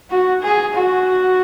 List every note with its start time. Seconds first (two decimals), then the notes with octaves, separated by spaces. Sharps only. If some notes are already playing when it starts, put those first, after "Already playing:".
0.10 F#4
0.42 G#4
0.75 F#4